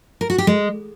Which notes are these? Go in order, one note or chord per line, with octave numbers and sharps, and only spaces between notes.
A#4
F#4
G4
G#3